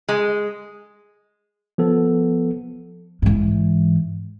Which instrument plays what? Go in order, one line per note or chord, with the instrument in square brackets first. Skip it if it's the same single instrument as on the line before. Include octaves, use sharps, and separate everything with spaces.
[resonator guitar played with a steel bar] G#3
[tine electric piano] F3 B3 A4
[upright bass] G#2 E3